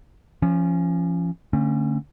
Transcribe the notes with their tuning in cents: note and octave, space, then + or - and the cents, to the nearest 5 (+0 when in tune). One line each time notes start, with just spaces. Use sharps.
F3 -30 C#4 +0
D3 +0 A3 +30 C#4 -25